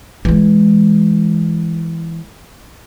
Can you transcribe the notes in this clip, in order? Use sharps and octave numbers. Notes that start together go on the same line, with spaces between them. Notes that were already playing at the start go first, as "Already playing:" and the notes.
E3 G#3